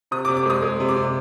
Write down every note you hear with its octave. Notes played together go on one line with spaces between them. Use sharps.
C3 D#6
D6
C3
D6
G#3 D#6
G#3
C3
D6
C3